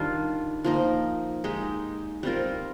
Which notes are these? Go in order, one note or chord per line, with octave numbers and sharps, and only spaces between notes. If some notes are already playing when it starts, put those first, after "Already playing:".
Already playing: D#3 G3 D4 F4
F3 A#3 D#4
G#3 D#4 G4
G3 C4 F4 A#4